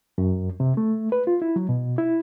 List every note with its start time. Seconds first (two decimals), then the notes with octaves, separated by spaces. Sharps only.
0.18 F#2
0.60 C3
0.77 A3
1.12 B4
1.27 F4
1.42 E4
1.56 F#3
1.69 B2
1.98 E4